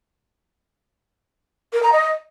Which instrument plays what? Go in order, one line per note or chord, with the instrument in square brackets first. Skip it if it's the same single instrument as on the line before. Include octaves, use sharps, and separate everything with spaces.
[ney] A#4
A#5
D#5